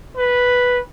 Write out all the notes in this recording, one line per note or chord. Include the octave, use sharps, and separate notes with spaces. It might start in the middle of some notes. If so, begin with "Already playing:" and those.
B4